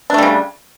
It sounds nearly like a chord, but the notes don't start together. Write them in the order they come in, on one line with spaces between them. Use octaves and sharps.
D4 A3 G3 C#3